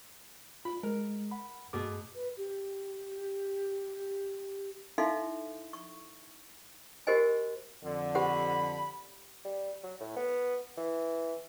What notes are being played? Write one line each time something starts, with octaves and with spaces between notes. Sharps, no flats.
F4 B5
G#3 A#4
F#5 B5
G2 B2 A3 G#4 D6
B4
G4
D#4 E4 A4 E5 F5 C6
C#6
F#4 G4 A#4 C5 D#5 G#5
F2 D3
G4 C5 F#5 B5
G3
F#3
A2
B3
E3